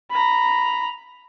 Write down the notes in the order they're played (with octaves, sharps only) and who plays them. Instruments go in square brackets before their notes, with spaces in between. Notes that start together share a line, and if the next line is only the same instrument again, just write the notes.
[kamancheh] A#5 B5